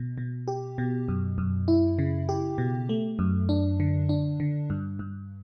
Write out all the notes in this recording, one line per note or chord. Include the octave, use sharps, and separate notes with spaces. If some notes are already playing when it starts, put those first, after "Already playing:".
Already playing: B2
B2
G4
B2
F#2
F#2
E4
C#3
G4
B2
A3
F#2
D4
D3
D4
D3
G2
G2